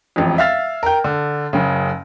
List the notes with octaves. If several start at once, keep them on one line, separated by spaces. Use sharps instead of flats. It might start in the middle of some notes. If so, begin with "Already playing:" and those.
E1 A1 F2
E5 F5 F6 A6
A#4 G5
D3
F#1 C#3